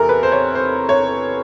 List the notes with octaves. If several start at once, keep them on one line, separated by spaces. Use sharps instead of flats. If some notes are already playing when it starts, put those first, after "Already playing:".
Already playing: E2 C3 A4 A#4
B4
C5
C#5
C5
C#5